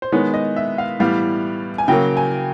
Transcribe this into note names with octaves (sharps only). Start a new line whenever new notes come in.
C5
D#3 G#3 B3 C#5
D#5
E5
F5
A2 E3 G3 B3 F5
G#5
C#3 F#3 A#3 G5
G#5